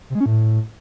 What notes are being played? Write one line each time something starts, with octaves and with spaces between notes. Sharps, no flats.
C3
G#3
C#4
A2